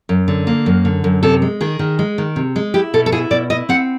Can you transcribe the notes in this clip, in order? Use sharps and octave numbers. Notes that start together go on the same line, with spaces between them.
F#2
D3
A#3
F#2
D3
F#2
C3 A4
G#3
D#3 G#4
D#3
G#3
D#3
C3
G#3
E4 G4
B2 A4
A4
E4 G#4
B2 D5
E4 D#5
C4 F#5